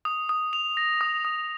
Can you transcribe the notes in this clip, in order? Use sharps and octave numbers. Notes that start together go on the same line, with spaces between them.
D#6
D#6
F7
A#6
D#6
D#6